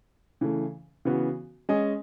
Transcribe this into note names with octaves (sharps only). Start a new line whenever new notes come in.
C#3 E3 A3
C#3 E3 B3 F#4
G#3 C#4 G#4 D#5